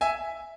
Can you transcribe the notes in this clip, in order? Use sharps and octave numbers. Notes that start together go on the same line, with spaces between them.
E5 G#5